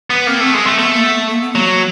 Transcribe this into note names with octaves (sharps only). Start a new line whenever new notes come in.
B3
A#3 C4
A3
G#3
A3
A3 B3
A#3
B3
A#3
B3
F#3 A#3